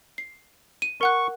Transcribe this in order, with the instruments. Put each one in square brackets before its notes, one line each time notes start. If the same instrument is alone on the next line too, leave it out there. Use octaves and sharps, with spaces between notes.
[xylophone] C7
D#7
[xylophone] A#4 F#5 F#6 [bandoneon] C#6